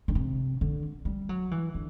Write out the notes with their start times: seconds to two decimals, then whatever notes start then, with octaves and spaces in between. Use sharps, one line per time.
0.08 D3
0.15 C3
0.61 D3
1.05 G3
1.29 F#3
1.51 E3
1.74 D3